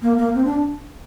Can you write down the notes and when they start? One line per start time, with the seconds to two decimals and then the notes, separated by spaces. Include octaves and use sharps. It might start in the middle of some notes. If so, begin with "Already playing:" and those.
0.02 A#3
0.18 A#3
0.35 C4
0.45 D4